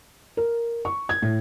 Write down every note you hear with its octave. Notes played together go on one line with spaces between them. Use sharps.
A#4
C#6
G#6
A2